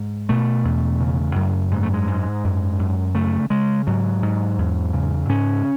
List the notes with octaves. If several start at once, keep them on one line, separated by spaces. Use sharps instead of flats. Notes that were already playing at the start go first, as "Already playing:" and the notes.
Already playing: G#2
B2 A3
E2
C#3
F#2
G#2 G#3
A3
G#3
G#2
F#2
F#2
C#3 A3
C#3 G#3
G#2 F#3
G#2
E2
C#3
G#2 C#4